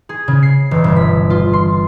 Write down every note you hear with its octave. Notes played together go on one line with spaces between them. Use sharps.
G#4
C#3
C7
E1
G1
B6
F4
C6